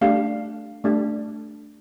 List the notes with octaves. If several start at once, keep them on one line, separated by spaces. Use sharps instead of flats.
A3 D4 G4 F5
A3 D4 G4